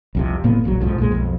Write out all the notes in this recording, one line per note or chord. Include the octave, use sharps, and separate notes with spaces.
C2 F2 C3
F#1 A2 A#3 B3
D#1 A#1 F3 F#3
B1 F2 G#2 F3
B1 A#2 G#3
B1 F2